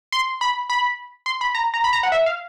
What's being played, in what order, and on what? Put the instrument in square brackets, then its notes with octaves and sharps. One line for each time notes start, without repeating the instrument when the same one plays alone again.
[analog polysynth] C6
B5
B5
C6
B5
A#5
A#5
B5
A#5
F#5
E5
F5